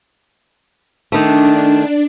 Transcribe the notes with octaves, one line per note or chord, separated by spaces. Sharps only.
D#3 A3 D4